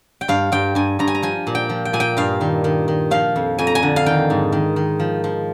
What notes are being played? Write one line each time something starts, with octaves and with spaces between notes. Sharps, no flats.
G5
G2 F5
G2 G5
G2 G#5
G2 A#5
G#5
A#5
F3 G#5
A#2
G5
F3
G5
A#2 G#5
G5
G2 F5
D#3
D#3
D#3
F3 F5
F2
F2 G#5
A#5
G#5
D3
F5
D#3 G5
G#2
D#3
D#3
F3
F3